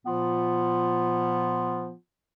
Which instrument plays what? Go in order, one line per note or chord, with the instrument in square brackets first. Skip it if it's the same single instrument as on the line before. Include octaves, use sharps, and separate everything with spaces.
[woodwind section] A#2 F3 B3 F4